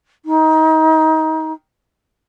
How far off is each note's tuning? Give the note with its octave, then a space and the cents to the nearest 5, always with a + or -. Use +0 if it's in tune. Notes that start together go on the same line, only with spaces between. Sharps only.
D#4 +25